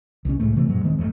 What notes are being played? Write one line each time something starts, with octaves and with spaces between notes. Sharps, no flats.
C2 C#4
C2 A2 G#3 A3
C3 E3 A3 C4
F#2 A#2 F#3 G#3
D1 D#3 G#3 C4
A1 F2 A3